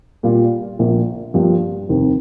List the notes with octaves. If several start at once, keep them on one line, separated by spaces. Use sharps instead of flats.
A#2 G3 A#3 F4
A#1 A#2 A#3 F4
G2 F3 A#3 G4
F1 D#2 D#3 C4